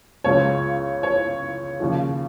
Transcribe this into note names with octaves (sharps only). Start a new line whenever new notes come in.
C#2 C#3 G#3 C#5
C#5
D#2 C#3 F3